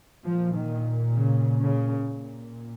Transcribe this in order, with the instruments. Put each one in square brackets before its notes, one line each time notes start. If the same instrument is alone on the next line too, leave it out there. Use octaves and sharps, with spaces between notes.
[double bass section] A#2 F3
D#3
C#3
C#3
A#2